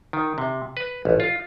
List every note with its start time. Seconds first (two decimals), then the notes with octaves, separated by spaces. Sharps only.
0.13 D#3
0.38 C3
0.77 B4
1.05 A1
1.20 F4